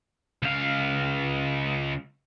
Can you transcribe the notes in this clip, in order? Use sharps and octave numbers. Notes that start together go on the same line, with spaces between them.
C#2 F5